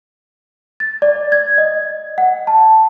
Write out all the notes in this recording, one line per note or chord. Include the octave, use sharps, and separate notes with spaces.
A6
D5
G#6
D#5
F#5
A5